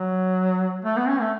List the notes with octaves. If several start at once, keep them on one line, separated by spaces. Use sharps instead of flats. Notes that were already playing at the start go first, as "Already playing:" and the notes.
Already playing: F#3
A3
B3
C#4
A3